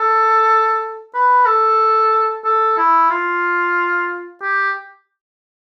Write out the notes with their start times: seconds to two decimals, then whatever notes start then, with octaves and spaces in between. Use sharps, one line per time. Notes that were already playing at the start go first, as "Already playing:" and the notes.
Already playing: A4
1.14 B4
1.46 A4
2.44 A4
2.77 E4
3.11 F4
4.41 G4